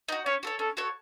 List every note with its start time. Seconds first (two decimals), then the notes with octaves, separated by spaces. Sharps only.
0.08 D#4 F#4
0.26 C#4 C#5
0.43 F#4 A4 C#5
0.59 C#4 A4
0.77 F#4 A4 C#5